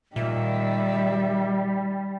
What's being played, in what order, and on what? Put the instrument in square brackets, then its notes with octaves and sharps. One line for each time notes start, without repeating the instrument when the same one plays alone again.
[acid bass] A#2 [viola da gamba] D#3 [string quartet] G3 [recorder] E5